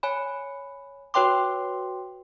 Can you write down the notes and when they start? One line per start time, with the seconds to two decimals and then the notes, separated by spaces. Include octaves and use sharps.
0.03 C#5 G#5 B5
1.14 F#4 B4 C#5 G5 C6 D6